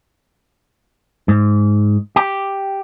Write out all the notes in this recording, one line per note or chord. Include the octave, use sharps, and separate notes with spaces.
G#2
G4